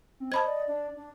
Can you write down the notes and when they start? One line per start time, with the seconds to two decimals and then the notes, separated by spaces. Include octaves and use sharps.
0.20 C4
0.32 C5 D#5 A5 B5 G#6
0.46 D5
0.67 D4
0.96 D4